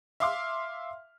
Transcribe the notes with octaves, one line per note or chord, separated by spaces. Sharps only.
E5 F5 C6 D6 F6